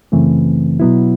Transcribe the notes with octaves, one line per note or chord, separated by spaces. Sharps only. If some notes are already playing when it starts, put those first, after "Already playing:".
F#2 C#3 E3 A3 C4
B2 F#3 B3 E4